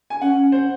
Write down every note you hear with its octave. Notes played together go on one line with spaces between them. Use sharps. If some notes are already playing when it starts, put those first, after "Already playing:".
G#5
C#4 F#5
C5